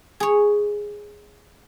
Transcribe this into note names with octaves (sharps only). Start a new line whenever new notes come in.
G#4 C#5